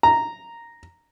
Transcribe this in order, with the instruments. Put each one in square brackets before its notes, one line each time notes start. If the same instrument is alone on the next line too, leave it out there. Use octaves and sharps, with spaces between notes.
[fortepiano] A#5